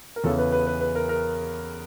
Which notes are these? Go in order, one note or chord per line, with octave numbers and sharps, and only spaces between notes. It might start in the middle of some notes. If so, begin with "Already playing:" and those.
A#4
E2 C#3 E3 A4
B4
B4
B4
B4
A#4
A#4